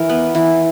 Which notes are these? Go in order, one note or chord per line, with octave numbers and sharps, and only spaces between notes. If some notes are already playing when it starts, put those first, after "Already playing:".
Already playing: E3 A#4
B3
E3